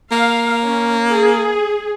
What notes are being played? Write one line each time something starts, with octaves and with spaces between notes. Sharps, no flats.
A#3 F5
C#4
G#4